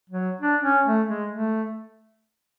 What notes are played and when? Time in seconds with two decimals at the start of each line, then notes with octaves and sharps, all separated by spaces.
0.10 F#3
0.41 D4
0.63 C#4
0.86 A3
1.08 G#3
1.31 A3